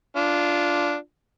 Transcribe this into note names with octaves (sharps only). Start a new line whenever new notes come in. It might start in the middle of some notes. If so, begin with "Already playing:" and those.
D4 F4